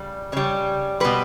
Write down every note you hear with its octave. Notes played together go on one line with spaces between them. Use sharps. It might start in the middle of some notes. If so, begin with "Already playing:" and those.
Already playing: C#3 G3 D5
C#3 G3 C#5
B2 G3 B4